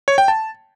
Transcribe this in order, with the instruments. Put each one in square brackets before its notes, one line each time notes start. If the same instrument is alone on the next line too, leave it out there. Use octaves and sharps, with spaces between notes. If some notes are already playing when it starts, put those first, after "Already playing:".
[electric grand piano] C#5
G5
A5